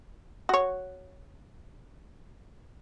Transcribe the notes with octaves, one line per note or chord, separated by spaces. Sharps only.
F#4 C#5